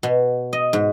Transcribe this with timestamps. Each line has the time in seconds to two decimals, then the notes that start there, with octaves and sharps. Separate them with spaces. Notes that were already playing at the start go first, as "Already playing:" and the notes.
0.03 B2
0.53 D#5
0.73 G#2